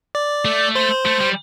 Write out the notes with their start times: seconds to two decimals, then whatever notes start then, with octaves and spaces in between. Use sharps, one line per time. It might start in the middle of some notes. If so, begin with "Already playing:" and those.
0.15 D5
0.45 A3
0.75 C5
1.06 A3
1.21 G3